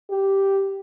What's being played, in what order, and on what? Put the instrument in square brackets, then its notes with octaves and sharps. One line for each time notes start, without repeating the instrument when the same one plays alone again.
[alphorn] G4